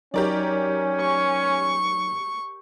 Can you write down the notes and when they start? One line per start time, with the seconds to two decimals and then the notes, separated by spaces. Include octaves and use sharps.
0.14 F#3 C#4 D#4 G4 A#4 C#5 D5
1.00 C#6